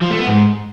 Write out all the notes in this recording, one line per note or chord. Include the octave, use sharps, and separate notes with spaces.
F3
A3
B3
G#2